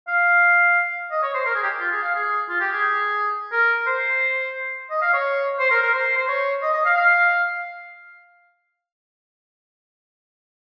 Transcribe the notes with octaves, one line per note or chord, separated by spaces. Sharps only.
F5
D#5
C#5
C5
A#4
G#4
G4
F4
G#4
F5
G#4
F4
G4
G#4
A#4
C5
D#5
F5
C#5
C5
A#4
A#4
C5
C5
C#5
D#5
D#5
F5
F5